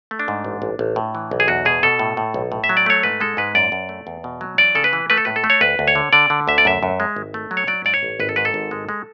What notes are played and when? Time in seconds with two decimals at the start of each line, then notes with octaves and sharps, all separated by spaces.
0.11 A3
0.19 D4
0.28 G#2
0.45 A1
0.62 A1
0.79 A1
0.96 A2
1.15 E3
1.31 B1
1.40 G#4
1.48 E2 F#4
1.65 B2 G#4
1.83 B2 A4
1.99 A2
2.17 A2
2.34 B1
2.52 A2
2.64 E5
2.69 F#3
2.77 D5
2.86 A3 C#5
3.03 G#2 B4
3.20 G#3 A4
3.37 G#2 B4
3.55 F#2 D5
3.72 F#2
3.89 A3
4.07 E2
4.24 B2
4.41 F#3
4.58 E3 D5
4.75 C#3 A4
4.84 B4
4.93 E3
5.10 A3 B4
5.18 A4
5.25 A2 B4
5.36 A4
5.44 A3
5.50 C#5
5.61 D2 B4
5.79 D2
5.88 C#5
5.95 D3
6.13 D3 D5
6.30 D3
6.48 D2 E5
6.58 D5
6.65 F#2 E5
6.83 F#2
7.00 G#3
7.16 G#1
7.34 A3
7.51 F#3
7.57 C#5
7.67 F#3 D5
7.85 G#2 D5
7.94 C#5
8.03 A1
8.20 G#1 B4
8.29 A4
8.36 G#2 B4
8.45 A4
8.54 G#1
8.71 G#3
8.89 G#3